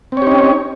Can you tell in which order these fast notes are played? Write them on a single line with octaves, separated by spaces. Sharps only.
C4 C#5 G4 D#4 C#4